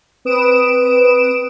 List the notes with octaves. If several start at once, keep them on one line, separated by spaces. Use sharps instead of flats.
C4 B4 D#6 D7 E7